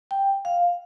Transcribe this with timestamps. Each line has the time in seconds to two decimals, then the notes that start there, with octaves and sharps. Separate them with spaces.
0.11 G5
0.45 F5